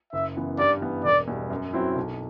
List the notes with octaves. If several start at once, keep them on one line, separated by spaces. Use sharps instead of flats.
F#1 E5
F#2 E3 B3
G2 D5
E3 B3
E1 D5
E2 B2 G3
F#2
F#3 C4 E4
B1